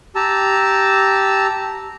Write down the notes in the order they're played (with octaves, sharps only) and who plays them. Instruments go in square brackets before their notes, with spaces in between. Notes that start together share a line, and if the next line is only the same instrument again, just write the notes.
[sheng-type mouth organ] G4 A5 A#5 E6